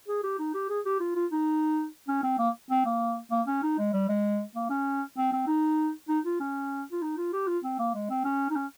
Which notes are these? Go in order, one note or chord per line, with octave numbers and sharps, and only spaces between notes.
G#4
G4
D#4
G4
G#4
G4
F4
F4
D#4
C#4
C4
A#3
C4
A#3
A#3
C#4
D#4
G#3
G3
G#3
A#3
C#4
C4
C4
D#4
D#4
F4
C#4
F4
D#4
F4
G4
F4
C4
A#3
G#3
C4
C#4
D#4
C#4